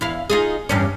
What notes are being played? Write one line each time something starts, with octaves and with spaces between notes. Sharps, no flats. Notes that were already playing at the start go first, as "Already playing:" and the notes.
E2 E4 F5
D#4 F4 G#4
E2 G2 C#4